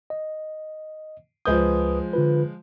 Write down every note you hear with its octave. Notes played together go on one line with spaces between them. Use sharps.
D#5
C#2 F3 G#3 B4 D#6 G6
D3 F4 B4